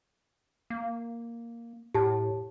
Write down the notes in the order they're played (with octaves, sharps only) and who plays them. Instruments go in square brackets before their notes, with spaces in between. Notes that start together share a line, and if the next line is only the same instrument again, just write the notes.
[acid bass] A#3
[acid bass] A2 [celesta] G4 A5